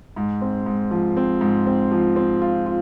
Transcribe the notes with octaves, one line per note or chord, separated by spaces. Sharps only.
G#2
C4
G#2
F3
C4
G#2
C4
F3
C4
F4
F4